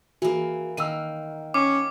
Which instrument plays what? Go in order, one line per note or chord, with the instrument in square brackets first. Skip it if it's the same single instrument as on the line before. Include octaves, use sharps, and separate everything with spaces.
[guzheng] E3 A#3 [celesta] F#4 G#4
[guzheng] D#3 A#3 [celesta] E6 D#7
[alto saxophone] C#4 [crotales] D6